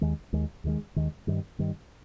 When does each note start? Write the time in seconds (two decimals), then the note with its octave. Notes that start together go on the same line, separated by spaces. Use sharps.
0.01 D#2 D#3 G#3
0.33 D#2 D#3 G#3
0.64 D#2 D#3 G#3
0.96 D#2 D#3 G#3
1.27 G2 D#3 G3
1.59 G2 D#3 G3